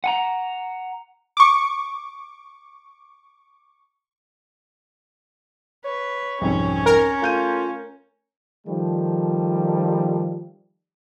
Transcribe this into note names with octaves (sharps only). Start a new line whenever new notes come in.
F#5 G#5 A#5
C#6 D6
B4 C#5
C2 F2 G#2 C#4
A#4
A3 F4 G6 D#7
D#3 F3 G3 A3